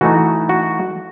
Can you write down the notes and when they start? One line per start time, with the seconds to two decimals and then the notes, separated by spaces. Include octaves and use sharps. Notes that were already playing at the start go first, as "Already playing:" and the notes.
0.01 E3 A3 D#4 F#4
0.49 F#4